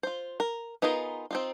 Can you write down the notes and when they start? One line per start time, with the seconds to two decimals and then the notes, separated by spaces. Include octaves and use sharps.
0.03 F4 C5
0.40 A#4
0.82 B3 D#4 F4 G#4 A#4
1.31 C4 D#4 F4